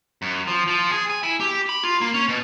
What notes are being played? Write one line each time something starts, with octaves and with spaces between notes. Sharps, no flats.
F#2
F3
F3
G#4
G#5
E4
G4
B5
F4
A#3
C#4
B2